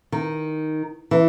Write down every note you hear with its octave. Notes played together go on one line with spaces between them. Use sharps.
D#3
E3